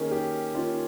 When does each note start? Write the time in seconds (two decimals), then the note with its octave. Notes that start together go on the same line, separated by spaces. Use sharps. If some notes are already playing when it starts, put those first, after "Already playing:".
Already playing: D#3 A#3 C#4 G#4
0.11 G4
0.54 D#3 A#3 C#4 F4